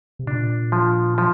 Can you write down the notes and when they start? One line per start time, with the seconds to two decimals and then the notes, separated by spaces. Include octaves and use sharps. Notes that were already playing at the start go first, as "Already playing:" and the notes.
0.19 C3
0.27 A#2 D4
0.72 F3
1.18 F3